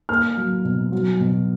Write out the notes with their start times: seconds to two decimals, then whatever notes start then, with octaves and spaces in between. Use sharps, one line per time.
0.09 A#3 F6
0.37 F#3
0.65 B2
0.92 F#3
1.21 B2